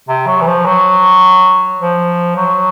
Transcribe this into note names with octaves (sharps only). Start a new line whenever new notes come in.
C3
F#3
E3
F3
F#3
F3
F#3